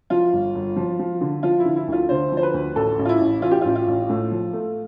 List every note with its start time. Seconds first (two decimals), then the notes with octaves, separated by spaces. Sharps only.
0.10 F3 F4
0.33 G1
0.55 G1
0.76 F3
0.99 F3
1.21 D3
1.43 F3 F4
1.60 E4
1.65 D3
1.76 E4
1.88 D2 F4
2.09 D3 C5
2.32 F3
2.37 C5
2.43 B4
2.54 D2
2.75 A1 A4
2.99 A1
3.05 F4
3.09 E4
3.21 A1
3.42 E3 F4
3.51 G4
3.61 A1 F4
3.76 F4
3.87 A1
4.09 A2
4.31 F3
4.53 A3